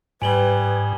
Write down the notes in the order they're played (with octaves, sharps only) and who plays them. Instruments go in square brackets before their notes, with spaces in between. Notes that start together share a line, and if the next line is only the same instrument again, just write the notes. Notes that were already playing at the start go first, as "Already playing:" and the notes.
[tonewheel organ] G#2 [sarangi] G3 [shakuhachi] B4 [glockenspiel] G#5 F#7 G7